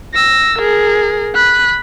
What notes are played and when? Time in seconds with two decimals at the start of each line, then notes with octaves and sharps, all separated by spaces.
0.14 E6 A#6
0.59 G#4 A#4
1.35 B5 F#6